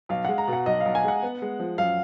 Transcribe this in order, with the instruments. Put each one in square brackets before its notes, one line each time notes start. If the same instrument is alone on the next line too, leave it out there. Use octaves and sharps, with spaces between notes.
[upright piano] B1 [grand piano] F5
[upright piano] G#3 [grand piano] F#5
[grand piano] A#5
[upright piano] B2
[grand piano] F#5
[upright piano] B1 [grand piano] D#5
[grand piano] F5
[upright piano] B1
[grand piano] G#5
[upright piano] G#3 [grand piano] F#5
[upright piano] B3
G#3
F3
[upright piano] F#2 [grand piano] F5